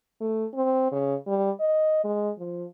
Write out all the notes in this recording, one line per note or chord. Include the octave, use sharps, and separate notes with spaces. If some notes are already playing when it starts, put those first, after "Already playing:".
A3
C4
C#3
G3
D#5
G#3
F3